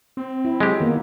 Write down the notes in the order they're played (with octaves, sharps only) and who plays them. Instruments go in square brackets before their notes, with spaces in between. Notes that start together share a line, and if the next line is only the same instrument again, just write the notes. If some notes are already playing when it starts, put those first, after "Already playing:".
[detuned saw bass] C4
[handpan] E4
[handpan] F#3 [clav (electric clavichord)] G#3 G4
[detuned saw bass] D#3 [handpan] A#3 B3